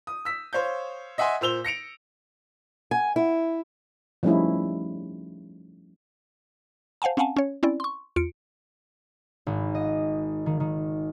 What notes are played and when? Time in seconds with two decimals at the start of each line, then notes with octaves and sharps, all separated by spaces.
0.07 D#6
0.25 E6 B6
0.53 C5 C#5 F5 G6
1.18 D#5 E5 F#5 G#5 C6
1.41 A#2 C5 E6 F7 G7
1.64 A#6 C#7 D7 F7
2.91 G#5
3.16 E4
4.23 F3 G3 A3 C#4 D#4 E4
7.02 C5 F5 F#5 G#5 A5
7.17 C4 C#4 F5 F#5 G#5 A5
7.37 C#4 C#5
7.63 C4 C#4 E4 D5
7.80 C6 C#6
8.16 E2 F4 C#7 D7
9.47 G#1
9.75 D#5
10.46 D#3
10.60 D#3